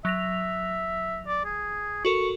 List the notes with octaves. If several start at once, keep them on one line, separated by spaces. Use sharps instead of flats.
F#3 E5 A#6 F7
D5
G#4
F#4 A4 A#4 C#6